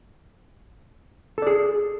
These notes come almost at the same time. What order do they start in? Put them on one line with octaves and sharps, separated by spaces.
A4 D5 G#4